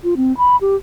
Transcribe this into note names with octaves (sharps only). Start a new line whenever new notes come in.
F4
C4
B5
G4